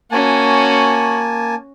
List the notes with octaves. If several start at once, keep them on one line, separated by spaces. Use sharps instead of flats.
A#3 C#4 F#4 G#5 A5